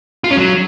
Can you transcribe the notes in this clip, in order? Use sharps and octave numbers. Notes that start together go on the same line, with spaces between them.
F4
C#4
F#3